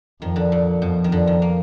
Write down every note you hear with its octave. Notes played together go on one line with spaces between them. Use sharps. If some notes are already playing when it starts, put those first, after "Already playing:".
F2 D#3
D3
A#2
F2 B2
D#3
F2 D3
D#3
A#3